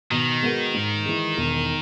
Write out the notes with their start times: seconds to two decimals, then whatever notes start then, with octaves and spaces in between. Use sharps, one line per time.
0.11 B2 D#3
0.42 G#3 B3 F#4 A#4
0.74 G#2
1.06 E3 G#3
1.37 E1